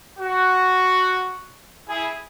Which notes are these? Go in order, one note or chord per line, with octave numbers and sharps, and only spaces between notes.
F#4
E4 G#4